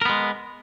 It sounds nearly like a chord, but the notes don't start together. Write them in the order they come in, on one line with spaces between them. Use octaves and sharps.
A#4 B3 G#3